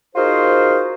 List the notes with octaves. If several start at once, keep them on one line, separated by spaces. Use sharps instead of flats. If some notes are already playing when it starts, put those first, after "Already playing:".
D#4 F4 F#4 G#4 A#4 C5